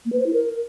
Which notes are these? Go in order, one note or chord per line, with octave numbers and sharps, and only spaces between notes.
A#3
B4
C5
E4
A#4